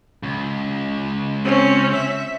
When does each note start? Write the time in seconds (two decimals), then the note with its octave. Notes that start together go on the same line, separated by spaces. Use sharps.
0.23 C#2
1.45 C4 C#4
1.94 E5